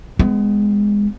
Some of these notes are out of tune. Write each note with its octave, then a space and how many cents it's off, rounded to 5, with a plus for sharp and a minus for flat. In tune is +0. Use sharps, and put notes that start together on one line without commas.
G#3 -15 B3 +25